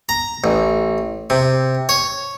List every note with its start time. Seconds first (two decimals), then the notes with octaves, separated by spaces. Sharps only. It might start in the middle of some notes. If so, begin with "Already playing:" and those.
0.09 A#5
0.44 A1
1.30 C3
1.89 C#5